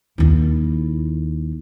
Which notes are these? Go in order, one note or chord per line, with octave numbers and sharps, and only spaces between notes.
D#2 E4